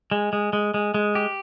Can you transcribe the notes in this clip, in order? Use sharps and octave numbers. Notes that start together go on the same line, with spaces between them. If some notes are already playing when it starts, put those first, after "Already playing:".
G#3
G#3
G#3
G#3
G#3
G4